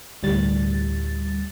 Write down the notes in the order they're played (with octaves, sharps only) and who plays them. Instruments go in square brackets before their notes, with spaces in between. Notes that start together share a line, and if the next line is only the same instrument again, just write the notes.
[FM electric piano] D2 A2 G3 A6